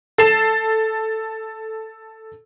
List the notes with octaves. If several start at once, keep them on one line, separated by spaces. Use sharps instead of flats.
A4 C7 E7